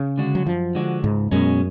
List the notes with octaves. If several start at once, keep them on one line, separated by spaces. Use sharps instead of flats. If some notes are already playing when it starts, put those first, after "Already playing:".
Already playing: C#3
D3 G#3 D4 F#4
F#3
F#2 F3
D3 G#3 D4 F#4
C#2 G#2
F#2 B2 G#3 C#4